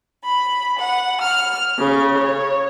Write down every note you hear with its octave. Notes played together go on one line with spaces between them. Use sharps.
B5
F#5
F6
C#3
C#5